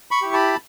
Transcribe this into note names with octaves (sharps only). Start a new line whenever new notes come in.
B5 C#6
E4 G4
A5 B5